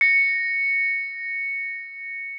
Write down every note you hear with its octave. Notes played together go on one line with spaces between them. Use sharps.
A#6 C#7